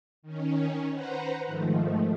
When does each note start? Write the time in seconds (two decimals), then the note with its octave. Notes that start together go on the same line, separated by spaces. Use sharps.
0.22 D#3 C#4
0.92 B4 C5 F#5 A#5
1.46 G#2 D#3 F3 A3